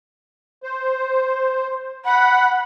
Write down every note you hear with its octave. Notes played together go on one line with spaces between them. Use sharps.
C5
F#5 B5